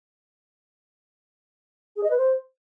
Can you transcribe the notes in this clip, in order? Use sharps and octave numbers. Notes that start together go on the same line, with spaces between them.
G#4
D#5
B4
C5